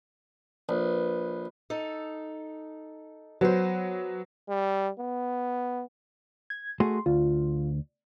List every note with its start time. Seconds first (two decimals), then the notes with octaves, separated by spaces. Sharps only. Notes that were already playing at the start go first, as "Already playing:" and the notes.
0.69 A#1 B4
1.70 D#4 A4
3.41 F#3 B3 C5
4.49 G3
5.00 B3
6.50 G#6
6.80 A3 F#4 G#4 C6
7.06 D2 F4